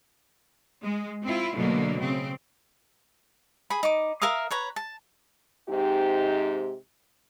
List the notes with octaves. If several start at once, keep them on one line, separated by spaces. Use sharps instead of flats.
G#3
C4 E4 F4
B2 D3 F#3 A3 A#3
C#3 C4
G#4 B5
D#4 D6
A#4 E5 F5 D#6
B4 C#5 A#5
A5
G#2 C3 D#4 G4